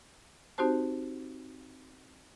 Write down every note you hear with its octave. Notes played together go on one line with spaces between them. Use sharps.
C4 D#4 F#4 G4 C5 A5